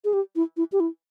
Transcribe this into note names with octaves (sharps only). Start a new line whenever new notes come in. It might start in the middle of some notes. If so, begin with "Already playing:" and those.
G#4
G4
E4
E4
G4
E4